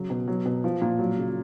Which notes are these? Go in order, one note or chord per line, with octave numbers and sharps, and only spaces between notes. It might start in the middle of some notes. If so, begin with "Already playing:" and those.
Already playing: C#3 F#3
B2
F#3
B2
F3
A#2
F#3
C#3